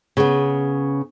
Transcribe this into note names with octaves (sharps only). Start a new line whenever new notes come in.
C#3 B3